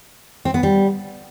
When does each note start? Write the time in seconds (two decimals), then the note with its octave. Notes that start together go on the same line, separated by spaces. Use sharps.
0.45 C4
0.54 B3
0.63 G3